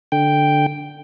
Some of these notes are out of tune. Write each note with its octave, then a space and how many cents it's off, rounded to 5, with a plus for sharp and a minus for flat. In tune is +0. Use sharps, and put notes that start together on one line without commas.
D3 +0 G5 +0